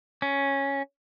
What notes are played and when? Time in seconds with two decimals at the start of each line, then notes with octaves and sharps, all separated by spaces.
0.22 C#4